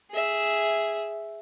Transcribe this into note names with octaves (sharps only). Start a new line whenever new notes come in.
G#4 E5